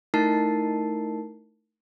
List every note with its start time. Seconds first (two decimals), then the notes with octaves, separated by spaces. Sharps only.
0.14 A3 D#4 E4 A#4 A5 C7